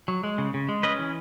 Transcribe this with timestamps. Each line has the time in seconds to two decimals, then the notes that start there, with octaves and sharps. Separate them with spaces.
0.08 F#3
0.24 G#3
0.38 C#3
0.54 C#3
0.69 G#3
0.83 C#4 B4 D#5
0.99 E3